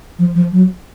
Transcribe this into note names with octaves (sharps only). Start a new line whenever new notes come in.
F3
F3
F#3